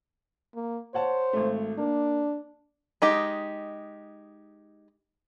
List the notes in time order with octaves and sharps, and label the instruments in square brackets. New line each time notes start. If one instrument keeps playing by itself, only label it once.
[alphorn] A#3
[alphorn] C5 [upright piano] C#5 F#5 A5
[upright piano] G#1 A3
[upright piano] A#3 [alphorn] D4
[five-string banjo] G#3 D#4 G4